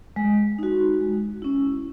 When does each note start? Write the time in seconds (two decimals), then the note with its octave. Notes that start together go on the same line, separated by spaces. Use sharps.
0.16 G#3
0.59 D#4 F#4
1.01 G#3
1.42 C#4 E4